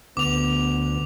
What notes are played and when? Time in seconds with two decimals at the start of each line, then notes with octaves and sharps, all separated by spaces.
0.17 D2 B3 D6 F7